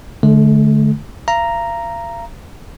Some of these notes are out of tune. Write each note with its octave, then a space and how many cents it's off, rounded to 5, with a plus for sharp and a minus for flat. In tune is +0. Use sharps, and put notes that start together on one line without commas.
D3 +0 A3 -40
F5 -40 A#5 +0